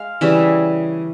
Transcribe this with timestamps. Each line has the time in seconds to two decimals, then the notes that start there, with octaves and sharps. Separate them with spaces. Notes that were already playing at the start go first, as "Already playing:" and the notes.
Already playing: G#3 F5
0.21 C#3 E3 G3 E5